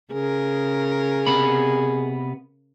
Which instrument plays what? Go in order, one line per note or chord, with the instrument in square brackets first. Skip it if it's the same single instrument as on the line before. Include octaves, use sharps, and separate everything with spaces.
[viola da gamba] C#3 A#4 [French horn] G#4
[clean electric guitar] C3 B3 B5